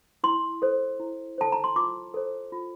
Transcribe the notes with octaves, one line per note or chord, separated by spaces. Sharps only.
E4 C6
A4 C5
E4
A4 C5 A5
A#5
C6
F4 D6
A4 C5
F4